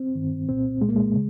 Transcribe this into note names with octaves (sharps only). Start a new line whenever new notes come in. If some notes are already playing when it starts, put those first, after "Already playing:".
Already playing: C4
G2 D#3
C2 A#2 C4
C2 A#2 G#3 A#3
G#3
C#3